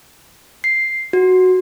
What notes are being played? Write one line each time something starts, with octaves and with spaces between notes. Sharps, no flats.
C7
F#4